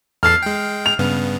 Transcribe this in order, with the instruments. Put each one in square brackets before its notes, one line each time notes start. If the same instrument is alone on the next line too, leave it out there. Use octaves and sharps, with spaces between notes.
[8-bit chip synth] E2 A4 A6 [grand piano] F6 C7
[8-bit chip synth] G#3 G5
[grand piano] F7
[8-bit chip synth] G2 C#3 B3